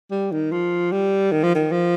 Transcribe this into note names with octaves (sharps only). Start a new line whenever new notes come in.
G3
D#3
F3
G3
D#3
F3
D#3
F3